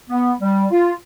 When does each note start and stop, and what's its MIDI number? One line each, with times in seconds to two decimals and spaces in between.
0.10 0.33 59
0.41 0.65 55
0.71 0.93 65